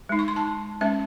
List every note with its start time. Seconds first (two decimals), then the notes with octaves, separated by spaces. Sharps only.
0.09 G#3 D#4
0.19 C#6
0.28 C6
0.36 A5
0.81 G#3 C#4 E5